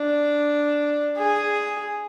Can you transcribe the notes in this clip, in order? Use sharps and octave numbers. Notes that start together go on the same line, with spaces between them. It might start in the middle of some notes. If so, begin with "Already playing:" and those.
Already playing: D4
G#4